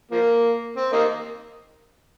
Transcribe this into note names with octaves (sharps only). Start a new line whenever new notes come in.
F3 A#3
C4
A#3 D#4